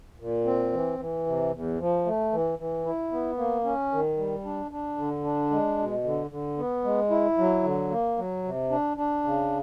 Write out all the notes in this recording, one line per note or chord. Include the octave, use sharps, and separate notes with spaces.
A#2
C4
E3
E3
C3
E2
F3
A3
E3
E3
E4
B3
A#3
C#4
D#3
G3
D4
D4
D3
D4
G#3
B2
D3
D3
B3
G#3
E4
F#3
D3
A#3
F#3
C3
D4
D4
C#3